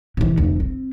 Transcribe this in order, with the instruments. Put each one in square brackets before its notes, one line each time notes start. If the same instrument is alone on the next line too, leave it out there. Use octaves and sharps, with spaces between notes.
[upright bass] C3 E3
F1 D2
C4